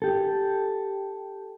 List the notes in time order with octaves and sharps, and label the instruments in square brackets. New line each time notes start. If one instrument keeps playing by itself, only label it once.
[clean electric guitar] G4 A4